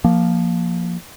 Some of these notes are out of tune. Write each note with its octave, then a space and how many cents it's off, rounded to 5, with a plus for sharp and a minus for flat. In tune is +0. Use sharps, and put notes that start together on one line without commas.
F3 +0 A#3 +0